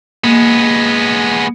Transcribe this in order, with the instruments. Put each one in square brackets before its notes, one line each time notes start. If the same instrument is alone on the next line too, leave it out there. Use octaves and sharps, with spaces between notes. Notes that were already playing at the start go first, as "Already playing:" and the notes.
[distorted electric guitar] G#3 B3 [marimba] A#3